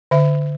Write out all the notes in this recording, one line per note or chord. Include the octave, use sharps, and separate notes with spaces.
D3 E5